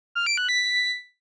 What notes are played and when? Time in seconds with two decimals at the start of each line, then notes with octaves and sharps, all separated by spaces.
0.15 F6
0.26 D7
0.38 F#6
0.49 B6